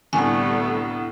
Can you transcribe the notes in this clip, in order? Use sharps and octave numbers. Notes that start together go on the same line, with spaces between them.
C2 A2 D3 G3 A3 B3 A4 G#5